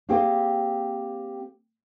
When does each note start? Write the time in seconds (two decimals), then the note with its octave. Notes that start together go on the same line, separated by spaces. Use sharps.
0.09 A#3 C4 G4 G#4 C5 G5